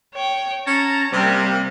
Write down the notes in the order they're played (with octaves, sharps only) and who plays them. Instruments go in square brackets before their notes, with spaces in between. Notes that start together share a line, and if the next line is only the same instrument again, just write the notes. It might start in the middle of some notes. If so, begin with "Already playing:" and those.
[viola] C#5 G5
[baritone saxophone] C#4 [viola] A5 A#5
[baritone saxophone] C3 [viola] G3 A#3